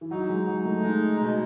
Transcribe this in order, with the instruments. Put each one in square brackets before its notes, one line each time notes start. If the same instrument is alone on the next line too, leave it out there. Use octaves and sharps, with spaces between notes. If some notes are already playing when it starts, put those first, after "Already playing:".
[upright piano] E3
[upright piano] F#3 [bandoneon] D#4
[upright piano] G#3
[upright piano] F#3 [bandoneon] D#4
[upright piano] A3
[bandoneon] G#3 [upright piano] A3
[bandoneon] B2